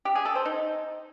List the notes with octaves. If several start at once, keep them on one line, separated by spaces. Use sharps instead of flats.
G4
G#4
A4
C5
D#4